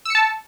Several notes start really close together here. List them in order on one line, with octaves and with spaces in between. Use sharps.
E6 C#7 A5